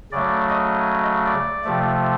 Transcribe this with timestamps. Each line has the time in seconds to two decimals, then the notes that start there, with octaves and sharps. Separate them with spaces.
0.12 C#3 F#3 A3 D5
0.50 D#5
1.26 D5
1.64 C3 F3 A3